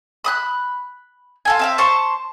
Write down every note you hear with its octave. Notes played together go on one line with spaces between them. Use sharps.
B5 D#6 F#6
F4 A4 G#5
C4 E5 F5
C5 A5 C#6